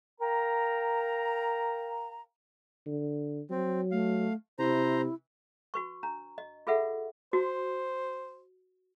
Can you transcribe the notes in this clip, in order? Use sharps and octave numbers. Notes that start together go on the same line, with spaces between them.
A#4 F5 G5 A#5
D3
F#3 C4
A3 F5
C3 E4 C5 A#5
F#4 B4 C#6
D4 A#5
D#5
F4 G#4 A4 B4 E5 F#5
F#4 C5